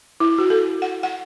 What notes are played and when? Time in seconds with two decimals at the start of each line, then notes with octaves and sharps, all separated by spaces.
0.20 E4
0.38 F#4
0.50 A4
0.82 F#5
1.03 F#5